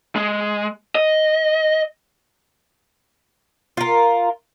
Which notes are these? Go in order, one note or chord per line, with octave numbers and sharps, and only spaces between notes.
G#3
D#5
F4 A#4